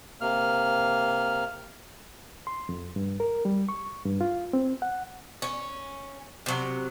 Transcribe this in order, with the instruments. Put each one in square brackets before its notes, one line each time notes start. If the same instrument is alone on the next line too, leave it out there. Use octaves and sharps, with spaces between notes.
[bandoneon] C3 A#3 F6
[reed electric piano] C6
F2
G2
A#4
G3
C#6
G2
F4
C4
F#5
[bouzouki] C#4
C3 F#3